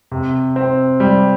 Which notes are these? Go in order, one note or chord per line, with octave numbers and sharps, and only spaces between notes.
C3
C4
G3